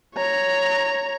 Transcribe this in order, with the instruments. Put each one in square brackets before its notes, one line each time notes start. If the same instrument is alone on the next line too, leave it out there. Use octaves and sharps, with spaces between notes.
[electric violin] C#5 A#5